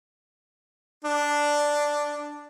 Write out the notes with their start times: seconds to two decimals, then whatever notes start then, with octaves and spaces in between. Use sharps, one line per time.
1.05 D4